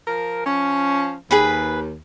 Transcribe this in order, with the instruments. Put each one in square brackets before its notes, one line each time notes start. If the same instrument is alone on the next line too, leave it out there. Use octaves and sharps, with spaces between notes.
[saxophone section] F3 A#4
F3 C#4
[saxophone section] D#2 [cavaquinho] G#4 B4 B5